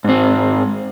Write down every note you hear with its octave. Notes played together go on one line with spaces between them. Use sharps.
G#2 C4